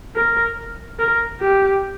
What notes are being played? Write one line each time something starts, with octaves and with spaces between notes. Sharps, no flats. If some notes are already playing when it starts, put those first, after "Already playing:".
A#4
A#4
G4